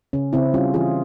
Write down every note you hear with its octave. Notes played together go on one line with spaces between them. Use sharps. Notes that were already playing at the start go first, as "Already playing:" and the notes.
C#3 C#4
C#3 C4 E4
G3 C#4 F4
E3 F4 G#4